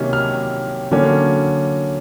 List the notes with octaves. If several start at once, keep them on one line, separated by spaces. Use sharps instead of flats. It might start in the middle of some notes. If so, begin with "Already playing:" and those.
Already playing: C3 D#3 F#3 A#3 C#4
F6
D3 F#3 A#3 C#4